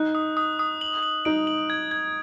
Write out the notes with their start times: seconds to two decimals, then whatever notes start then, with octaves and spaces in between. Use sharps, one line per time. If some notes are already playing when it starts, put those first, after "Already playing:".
Already playing: D#4 F#6
0.15 D#6
0.37 D#6
0.59 D#6
0.81 F#7
1.03 F#7
1.25 D#4 D7
1.47 F#7
1.70 G#6
1.91 G#6